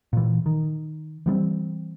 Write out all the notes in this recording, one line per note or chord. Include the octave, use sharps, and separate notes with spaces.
A#2 E3
D#3
E3 G3 B3 C4